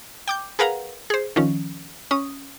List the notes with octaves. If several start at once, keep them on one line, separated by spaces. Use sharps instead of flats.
G5 D6 G6
G#4 A#4 B4 F5 F#5 A#5
G#4 C5
D#3 F3 C#4
C#4 D#6